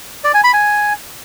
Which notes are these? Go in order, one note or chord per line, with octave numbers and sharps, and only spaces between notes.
D5
G#5
B5
G#5